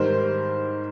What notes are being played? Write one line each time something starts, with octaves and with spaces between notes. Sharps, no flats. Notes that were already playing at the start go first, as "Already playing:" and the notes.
Already playing: G#2 D#3 G3 A#4 C5